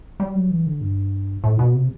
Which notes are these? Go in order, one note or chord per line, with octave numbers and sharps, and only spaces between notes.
G3
F#3
E3
D3
G2
A2
B2
C3